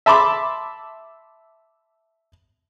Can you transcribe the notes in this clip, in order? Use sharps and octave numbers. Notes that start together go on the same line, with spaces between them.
E5 A5 B5 C6 D6